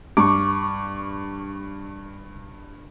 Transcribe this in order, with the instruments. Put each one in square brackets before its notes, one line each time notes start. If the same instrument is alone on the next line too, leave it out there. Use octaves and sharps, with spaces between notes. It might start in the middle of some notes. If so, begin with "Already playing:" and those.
[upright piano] G2 [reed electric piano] C#6 D6